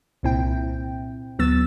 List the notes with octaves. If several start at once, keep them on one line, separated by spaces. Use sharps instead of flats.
C2 A#2 C4 E4 G5
D2 F#3 B3 E6 A6